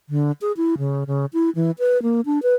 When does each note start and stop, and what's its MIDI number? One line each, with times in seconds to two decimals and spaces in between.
0.09 0.32 50
0.41 0.52 68
0.57 0.75 64
0.78 1.04 49
1.07 1.26 49
1.33 1.50 64
1.55 1.71 52
1.79 2.01 71
2.03 2.21 58
2.26 2.42 62
2.43 2.55 71